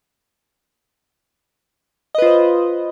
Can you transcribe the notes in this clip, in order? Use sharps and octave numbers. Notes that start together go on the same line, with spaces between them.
F4 B4 C5 D#5